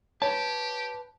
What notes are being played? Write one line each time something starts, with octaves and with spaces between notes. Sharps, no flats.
G4 B4 C#5 A5